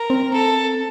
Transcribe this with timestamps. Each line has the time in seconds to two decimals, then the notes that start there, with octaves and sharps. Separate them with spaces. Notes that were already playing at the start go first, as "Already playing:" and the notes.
Already playing: A#4
0.10 C4
0.33 A4